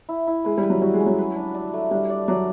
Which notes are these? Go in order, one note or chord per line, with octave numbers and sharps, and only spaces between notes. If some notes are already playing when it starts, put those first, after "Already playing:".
E4
E4
G#3 B4
G3
B4
F#3
G3 F#4
G#3
C#4
F#3
B4
D4
D4
A3
G3 D4
D5
F#3 D5